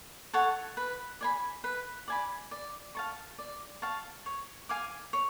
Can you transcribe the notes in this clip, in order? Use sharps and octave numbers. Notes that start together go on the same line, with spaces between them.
A4 C#5 F#5
B4
D5 G#5 B5
B4
D5 G#5 B5
D5
F5 A5 C#6
D5
F5 A5 C#6
C#5
F5 G#5 D6
C#5